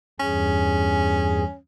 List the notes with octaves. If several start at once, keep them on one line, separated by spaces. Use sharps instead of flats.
E2 G2 C#4 G#4